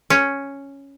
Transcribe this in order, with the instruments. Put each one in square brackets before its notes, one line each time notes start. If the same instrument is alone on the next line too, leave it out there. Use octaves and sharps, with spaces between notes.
[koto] C#4